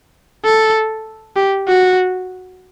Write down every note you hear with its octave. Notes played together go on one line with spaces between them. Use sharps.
A4
G4
F#4